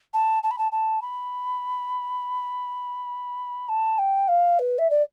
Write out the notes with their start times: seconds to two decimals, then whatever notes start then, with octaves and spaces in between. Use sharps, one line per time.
0.13 A5
0.43 A5
0.51 B5
0.58 A5
0.72 A5
1.01 B5
3.68 A5
3.98 G5
4.28 F5
4.59 B4
4.78 E5
4.90 D5